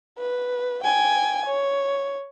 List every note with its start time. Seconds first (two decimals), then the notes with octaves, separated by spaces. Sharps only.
0.18 B4
0.84 G5 G#5
1.46 C#5